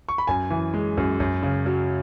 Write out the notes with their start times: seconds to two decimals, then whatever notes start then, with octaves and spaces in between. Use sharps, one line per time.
0.09 C#6
0.18 B5
0.27 F#2 G#5
0.50 E3
0.74 G#3
0.97 F#2
1.20 F#2
1.43 C#3
1.66 F#3